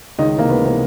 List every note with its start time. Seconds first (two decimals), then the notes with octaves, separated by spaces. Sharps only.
0.18 C#2 D#3 D#4
0.34 C3 E3 A#3
0.49 C#2 B3
0.65 C3 E3 B3